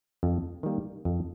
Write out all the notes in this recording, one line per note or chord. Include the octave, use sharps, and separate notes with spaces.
F2
D#3 G3 A#3
F2